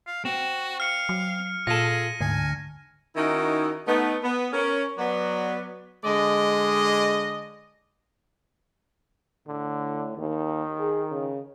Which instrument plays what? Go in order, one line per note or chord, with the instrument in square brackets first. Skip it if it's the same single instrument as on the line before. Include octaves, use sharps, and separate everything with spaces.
[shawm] F5
[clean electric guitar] C4 [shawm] F#4
[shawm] F5 [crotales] F6 C#7
[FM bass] F#3
[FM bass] A#2 [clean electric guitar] F4 A4 [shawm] G#4 [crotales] A#6 D#7
[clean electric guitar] D2 [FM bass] G#2 [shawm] G#5
[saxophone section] D#3 C#4 D#4 E4 F#4 A#4
A3 B3 D#4
B3
C#4 A#4
F#3 B3 D5
[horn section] D3 G#3 D5 D#5
[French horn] A2 [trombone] D3
[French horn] D#2 [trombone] D#3
[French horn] G#4
C#3